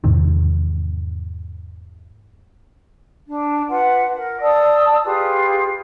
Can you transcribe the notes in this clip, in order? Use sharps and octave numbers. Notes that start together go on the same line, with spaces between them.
E2 G#2 C3 D#3
D4
F4 B4 F#5
A#4
D5 A5 D#6 E6
F4 G4 G#4 B4